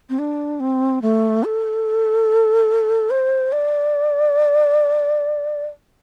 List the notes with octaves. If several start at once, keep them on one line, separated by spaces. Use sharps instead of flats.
C4
D4
C4
A3
A4
C5
D5